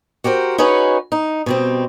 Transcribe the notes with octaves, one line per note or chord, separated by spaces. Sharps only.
F#4 G4 A#4 C5
C#4 D#4 F#4 G#4 B4 C#5
D#4
B2 G3 C4